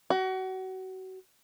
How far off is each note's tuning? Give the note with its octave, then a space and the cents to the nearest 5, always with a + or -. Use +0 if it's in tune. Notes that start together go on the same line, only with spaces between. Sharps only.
F#4 +30